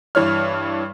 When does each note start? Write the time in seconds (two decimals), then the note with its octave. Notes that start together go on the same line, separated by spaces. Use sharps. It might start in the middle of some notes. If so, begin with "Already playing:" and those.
0.15 G2 E3 C#5 F6